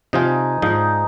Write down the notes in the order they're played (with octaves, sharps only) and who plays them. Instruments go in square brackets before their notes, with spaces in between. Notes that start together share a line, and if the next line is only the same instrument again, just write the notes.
[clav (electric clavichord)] C3 F3 F4 [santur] D#4 G#5
[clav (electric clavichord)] G#2 F3 [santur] D#4